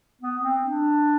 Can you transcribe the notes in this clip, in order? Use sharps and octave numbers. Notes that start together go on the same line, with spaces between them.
B3
C4
D4